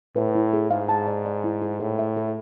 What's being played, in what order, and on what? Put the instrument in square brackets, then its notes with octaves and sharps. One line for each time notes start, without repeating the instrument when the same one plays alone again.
[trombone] A2 [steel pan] B4
[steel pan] E4
G#4
[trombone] G#2 [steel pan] F5
[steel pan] A5
D5
D5
E4
G#4
[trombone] A2 [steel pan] C5
[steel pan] E5
A4